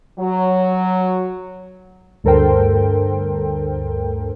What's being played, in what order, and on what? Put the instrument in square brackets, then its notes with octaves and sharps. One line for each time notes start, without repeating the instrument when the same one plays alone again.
[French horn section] F#3
[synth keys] D2 G2 A4 A#4 C5 G5